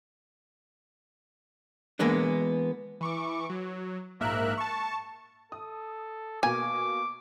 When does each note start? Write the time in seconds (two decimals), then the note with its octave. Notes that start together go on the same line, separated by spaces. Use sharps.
1.99 E3 G#3 A#3 B3 D4
3.01 E3 C#6 D6
3.50 F#3
4.20 A#1 G#2 A#3 A#4 E5 F#6
4.57 A5 C#6
5.52 A4 D#6
6.43 B2 A#3 G#5 D6